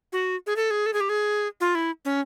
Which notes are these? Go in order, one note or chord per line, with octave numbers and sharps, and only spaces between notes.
F#4
G#4
A4
G#4
A4
G#4
G4
G#4
F4
E4
C#4